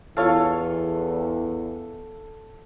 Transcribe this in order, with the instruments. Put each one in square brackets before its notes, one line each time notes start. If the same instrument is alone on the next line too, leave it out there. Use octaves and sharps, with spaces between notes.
[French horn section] E2 E3 [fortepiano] F4 C#5 F5 [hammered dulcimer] A4